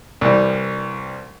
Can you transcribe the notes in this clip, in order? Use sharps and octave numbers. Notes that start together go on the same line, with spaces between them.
C2 E3 G3